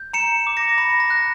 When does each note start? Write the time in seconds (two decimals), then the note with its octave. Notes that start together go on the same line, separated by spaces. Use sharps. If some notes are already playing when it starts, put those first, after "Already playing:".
Already playing: G6
0.13 A#5 C#7 E7
0.47 D6
0.57 A#6 C#7
0.78 B5 A#6
1.00 A#6
1.10 F#6